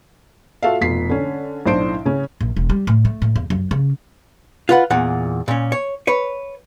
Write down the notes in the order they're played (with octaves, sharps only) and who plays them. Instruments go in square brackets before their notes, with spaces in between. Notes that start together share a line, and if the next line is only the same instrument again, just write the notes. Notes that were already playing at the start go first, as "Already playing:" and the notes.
[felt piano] F4 F#4 A4 E5 F5
F1 B2 F4 B6 C7
D3 C#4
B1 A2 D4 C5 C6 D7
C#3 C#4
[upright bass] A#1
E1
G3
A2
A3
A2
E2
F#2
C#3
[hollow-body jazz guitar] F4 B4 F#5
E2 A#2 F#5
A#2 C#4
C#5
B4 C#5